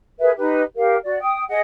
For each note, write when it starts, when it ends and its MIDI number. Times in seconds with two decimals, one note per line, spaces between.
0.20 0.31 68
0.20 0.31 70
0.20 0.31 71
0.20 0.31 76
0.37 0.61 63
0.37 0.61 67
0.37 0.61 71
0.76 0.96 67
0.76 0.96 70
0.76 0.96 77
1.04 1.18 66
1.04 1.18 74
1.21 1.43 79
1.21 1.43 87
1.48 1.61 68
1.48 1.61 75
1.48 1.61 78